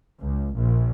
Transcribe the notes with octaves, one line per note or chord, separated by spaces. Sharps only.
C#2
A#1